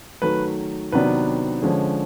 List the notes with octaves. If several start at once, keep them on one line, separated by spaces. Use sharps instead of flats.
D#3 F#3 A3 B4
C3 D#3 F#3 B3 D4 B4
D3 F3 G#3 C#4